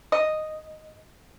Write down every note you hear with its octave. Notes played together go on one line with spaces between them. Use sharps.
D#5